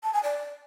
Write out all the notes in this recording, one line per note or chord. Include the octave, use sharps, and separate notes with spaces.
A5
G#5
D5